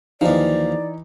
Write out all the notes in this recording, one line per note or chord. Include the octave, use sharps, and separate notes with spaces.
D#2 E3 F3 D#4 D5